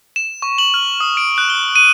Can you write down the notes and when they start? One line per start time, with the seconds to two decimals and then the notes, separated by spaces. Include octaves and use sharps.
0.16 E7
0.42 C#6
0.58 F#7
0.74 F6
1.00 D#6
1.17 D7
1.38 F#6
1.50 G7
1.76 D#7